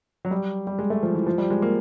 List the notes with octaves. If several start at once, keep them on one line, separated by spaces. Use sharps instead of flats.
F#3
G3
G3
G#3
A3
F3
E3
F3
G3
G#3
A#3